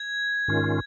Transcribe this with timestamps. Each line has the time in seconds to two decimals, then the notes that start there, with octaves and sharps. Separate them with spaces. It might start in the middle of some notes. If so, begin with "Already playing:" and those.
Already playing: G#6
0.48 G#2 D#3 C#4 F4